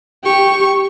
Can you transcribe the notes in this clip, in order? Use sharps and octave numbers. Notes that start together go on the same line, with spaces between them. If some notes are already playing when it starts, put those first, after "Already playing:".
G4 C#6